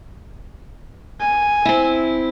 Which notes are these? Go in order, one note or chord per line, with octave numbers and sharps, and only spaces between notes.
G#5
C4 E4